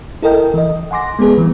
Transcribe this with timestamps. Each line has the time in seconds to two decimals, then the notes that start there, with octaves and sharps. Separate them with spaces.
0.22 E4 A4 A#4 D#5 G5
0.54 E3 D#5
0.91 F#5 G#5 C6 D6 A#6
1.19 G#3 B3 G#4 B4
1.38 E3 G3